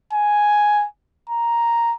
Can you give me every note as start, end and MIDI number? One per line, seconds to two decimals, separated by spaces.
0.13 0.85 80
1.30 1.94 82